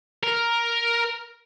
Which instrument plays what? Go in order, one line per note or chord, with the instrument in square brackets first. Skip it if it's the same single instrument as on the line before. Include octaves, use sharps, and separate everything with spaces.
[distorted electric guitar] A#4